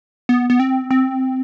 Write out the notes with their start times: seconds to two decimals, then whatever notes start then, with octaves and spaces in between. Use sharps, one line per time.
0.29 B3
0.50 B3
0.60 C4
0.91 C4